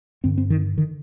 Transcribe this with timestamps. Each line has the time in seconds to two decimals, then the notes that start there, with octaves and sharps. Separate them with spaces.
0.24 G2 D3 C4
0.38 C4
0.50 D#3
0.78 D3 D#3